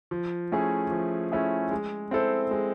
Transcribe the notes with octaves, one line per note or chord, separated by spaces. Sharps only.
F3
A3 C#4 E4 G#4
F3
A3 C#4 E4 G#4
G#3
C4 E4 A4 C5
G#3